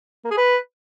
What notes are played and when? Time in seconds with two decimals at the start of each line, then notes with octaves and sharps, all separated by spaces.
0.25 A#3
0.31 G#4
0.37 B4